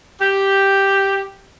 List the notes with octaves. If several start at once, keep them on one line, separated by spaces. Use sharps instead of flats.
G4